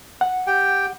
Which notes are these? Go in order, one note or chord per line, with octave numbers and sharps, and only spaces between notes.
F#5
G4 G5